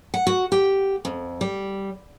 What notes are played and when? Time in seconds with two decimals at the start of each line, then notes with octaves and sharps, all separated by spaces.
0.14 F#5
0.27 F#4
0.52 G4
1.05 F2
1.41 G3